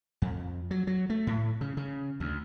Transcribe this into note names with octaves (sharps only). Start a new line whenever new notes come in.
F2
F#3
F#3
A3
A2
C#3
C#3
D2